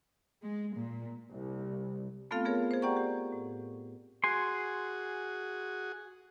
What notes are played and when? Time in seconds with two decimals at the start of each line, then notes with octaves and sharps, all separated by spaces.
0.42 G#3
0.76 A#2
1.31 C2
2.31 A3 B3 C4 F4 A4 F5
2.45 B3 G#4 A#4 C#5
2.71 G#4 C5
2.82 G4 D5 F#5 G5 A#5 C#6
2.97 G4
3.32 A2
4.24 F#4 G#4 G#5 C6